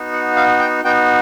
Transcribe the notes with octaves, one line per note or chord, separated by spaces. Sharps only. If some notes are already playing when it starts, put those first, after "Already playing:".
Already playing: B3 D#4 F#4
F#5
F5
G5
B3 D#4 F#4 G5